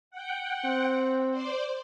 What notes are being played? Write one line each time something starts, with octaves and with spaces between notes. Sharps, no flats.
F#5 G5
C4
C5 D5